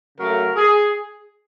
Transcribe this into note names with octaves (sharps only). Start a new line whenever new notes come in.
C#3 F#3 A3 A#4
G#4